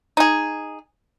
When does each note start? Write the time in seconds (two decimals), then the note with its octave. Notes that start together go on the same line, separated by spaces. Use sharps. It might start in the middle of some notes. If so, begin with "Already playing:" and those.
0.17 D#4 G#4